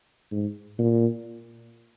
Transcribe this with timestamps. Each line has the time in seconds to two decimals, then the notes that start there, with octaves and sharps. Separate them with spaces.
0.32 G#2
0.78 A#2